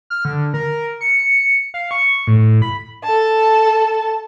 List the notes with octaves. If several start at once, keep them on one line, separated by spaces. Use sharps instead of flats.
F6
D3
A#4
C#7
F5
C#6
A2
B5
A4 A5